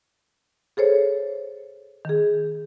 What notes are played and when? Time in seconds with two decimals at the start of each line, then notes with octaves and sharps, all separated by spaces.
0.77 G#4 A4 C5 C#5
2.05 D#3 G#4